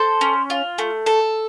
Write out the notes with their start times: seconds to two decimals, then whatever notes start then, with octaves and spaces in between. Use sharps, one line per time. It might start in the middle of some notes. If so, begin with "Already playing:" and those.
Already playing: A4 C5
0.21 C#4
0.50 F4
0.78 A3
1.06 A4